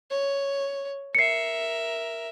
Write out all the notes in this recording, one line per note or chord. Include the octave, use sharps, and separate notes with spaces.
C#5
A#4 E5 C7 C#7